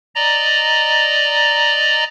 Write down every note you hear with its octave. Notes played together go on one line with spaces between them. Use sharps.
D5 D#5 A#5